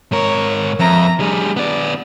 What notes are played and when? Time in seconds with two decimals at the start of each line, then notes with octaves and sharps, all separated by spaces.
0.12 G#2 A#4 C#5
0.79 F2 E5 A#5
1.20 G3 D4 G#4
1.57 B3 D5